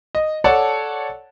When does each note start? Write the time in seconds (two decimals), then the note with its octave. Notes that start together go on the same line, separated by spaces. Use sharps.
0.15 D#5
0.44 A4 C#5 D5 F#5 A5